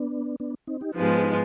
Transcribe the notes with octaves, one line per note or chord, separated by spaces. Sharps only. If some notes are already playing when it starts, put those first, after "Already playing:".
Already playing: B3 D4
B3 D4
C4 D#4
D#4 G4
G#2 F3 G#3 B3 D#4 G4
F4 G#4
D#4 G4